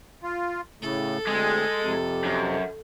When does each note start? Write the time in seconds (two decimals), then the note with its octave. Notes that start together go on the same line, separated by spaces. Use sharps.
0.23 F4
0.82 A2 C#3 A3 A4
1.27 D2 G#3 C4 G#4
1.82 F2 C3
2.24 F#2